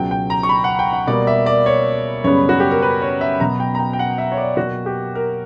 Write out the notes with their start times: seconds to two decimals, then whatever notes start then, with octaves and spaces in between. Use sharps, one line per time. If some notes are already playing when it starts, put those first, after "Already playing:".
Already playing: C#2 B2 F#3 G5
0.11 G5
0.30 A#5
0.43 C#6
0.49 B5
0.64 F#5
0.79 G5
0.93 F#5
1.07 B2 G3 A#3 D5
1.27 E5
1.46 D5
1.66 C#5
2.24 F#2 C#3 G3 B3 C#5
2.49 F#4
2.60 G4
2.71 A#4
2.82 B4
3.02 C#5
3.21 E5
3.40 B2 F#3 B3 A#5
3.60 G5
3.75 A#5
3.79 G5
3.93 G5
3.99 F#5
4.18 E5
4.32 C#5
4.37 D5
4.57 B2 F#3 A#3 F#4
4.86 G4
5.15 A#4